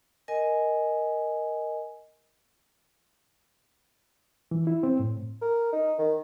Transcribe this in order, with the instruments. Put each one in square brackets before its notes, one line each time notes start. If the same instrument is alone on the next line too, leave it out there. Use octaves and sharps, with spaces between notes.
[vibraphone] A#4 D#5 G#5
[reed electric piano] E3
E4
C4
A2
[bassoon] A#4
D#4
D#3